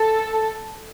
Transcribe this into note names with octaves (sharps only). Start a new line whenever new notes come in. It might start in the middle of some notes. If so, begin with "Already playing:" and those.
Already playing: A4